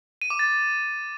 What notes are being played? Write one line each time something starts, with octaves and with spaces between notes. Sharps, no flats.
D#7
D6
A6